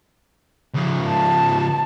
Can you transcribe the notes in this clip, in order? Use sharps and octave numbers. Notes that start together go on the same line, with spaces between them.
C#2 F3
A5